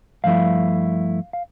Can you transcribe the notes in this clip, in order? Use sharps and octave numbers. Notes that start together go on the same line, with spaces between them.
G2 F3 A3 E4 F5
F5